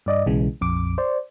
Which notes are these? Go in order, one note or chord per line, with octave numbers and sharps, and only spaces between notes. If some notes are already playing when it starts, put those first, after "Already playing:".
G2 D5 D#5
B1 C#3 E3 G#3
A#1 F2 D6
C5 D5